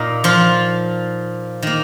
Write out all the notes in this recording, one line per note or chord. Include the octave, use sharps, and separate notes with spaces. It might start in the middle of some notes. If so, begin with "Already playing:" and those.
Already playing: A#2 A#3 D#4
F3 F4
D#3 A#3